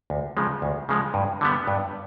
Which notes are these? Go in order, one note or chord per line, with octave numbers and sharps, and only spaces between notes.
D2
C#3 F3 G#3
D2
C#3 F3 G#3
G2
D3 G3 B3
G2